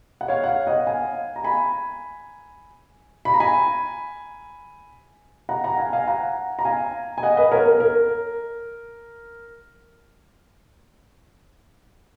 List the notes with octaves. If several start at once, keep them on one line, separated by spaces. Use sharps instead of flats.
F#5
C#5 F5
F#5
C#5 F5
D#5 F#5
F5 G#5
A#5
G#5 B5
B5
A#5
G#5 B5
F#5 A#5
F#5 A#5
F5 G#5
F5 G#5
F#5 A#5
A#5
F5 G#5
G#5
D#5 F#5
B4 D#5
A#4 C#5
A#4
A#4